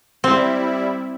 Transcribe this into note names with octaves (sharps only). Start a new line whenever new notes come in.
G3 C4 E4